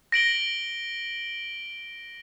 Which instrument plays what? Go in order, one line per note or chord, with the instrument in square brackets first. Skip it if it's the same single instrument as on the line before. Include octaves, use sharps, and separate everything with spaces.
[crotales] A#6 D7 F#7 G7